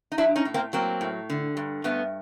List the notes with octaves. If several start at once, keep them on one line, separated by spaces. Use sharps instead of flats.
D#4
F#3 D4 E4
C#4 D#4
A2
A#3 C4
F#3 A#3 C4
A2
D3
G2
G2 A3 B3